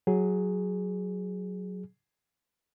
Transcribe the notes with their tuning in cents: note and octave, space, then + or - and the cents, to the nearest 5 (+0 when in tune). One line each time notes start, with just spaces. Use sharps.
F#3 +0 G#4 +0